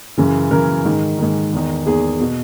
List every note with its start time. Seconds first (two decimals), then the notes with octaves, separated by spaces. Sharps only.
0.18 F#2 C#3 E3
0.51 F#2 C#3 E3 A#4
0.85 G#2 D#3
1.18 G#2 D#3
1.53 E2 D#3
1.86 E2 D#3 G#4
2.20 B2